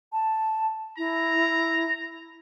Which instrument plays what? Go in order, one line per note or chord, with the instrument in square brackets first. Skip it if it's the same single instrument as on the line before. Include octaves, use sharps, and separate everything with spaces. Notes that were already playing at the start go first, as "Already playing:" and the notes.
[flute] A5
[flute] E4 [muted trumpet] A#5